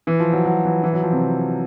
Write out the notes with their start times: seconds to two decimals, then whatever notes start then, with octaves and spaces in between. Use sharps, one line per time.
0.07 E3
0.20 F3
0.33 F#3
0.45 F#3
0.65 E3
0.83 E3
0.93 F#3
1.03 F3
1.12 C3